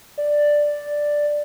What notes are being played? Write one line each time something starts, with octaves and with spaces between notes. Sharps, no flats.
D5